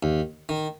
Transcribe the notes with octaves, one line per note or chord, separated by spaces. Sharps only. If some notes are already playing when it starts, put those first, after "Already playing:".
D#2
D#3